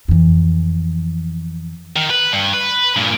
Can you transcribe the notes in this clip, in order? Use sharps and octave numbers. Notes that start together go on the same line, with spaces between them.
F2 E3
D#3
B4
G2
B4
G2 A#2